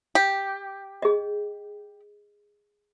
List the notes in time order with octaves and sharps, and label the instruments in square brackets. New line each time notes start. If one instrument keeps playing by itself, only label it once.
[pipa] G4
[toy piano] G#4 D#5